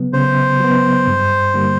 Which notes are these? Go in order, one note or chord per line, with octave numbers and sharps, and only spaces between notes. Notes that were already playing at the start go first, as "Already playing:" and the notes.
Already playing: C#3 F#3 B3
C#3 C5
F#3 B3
G2
D3 G3 A#3